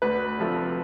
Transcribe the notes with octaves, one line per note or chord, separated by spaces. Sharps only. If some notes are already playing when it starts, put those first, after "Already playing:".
D2 B4
C3 F3 A3